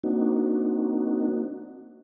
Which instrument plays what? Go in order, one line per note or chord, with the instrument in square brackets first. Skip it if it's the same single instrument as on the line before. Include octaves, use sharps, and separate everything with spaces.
[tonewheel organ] A#3 C4 D4 D#4 F#4